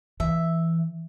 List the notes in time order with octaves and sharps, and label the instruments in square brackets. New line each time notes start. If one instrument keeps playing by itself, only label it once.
[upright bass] E3 [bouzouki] E5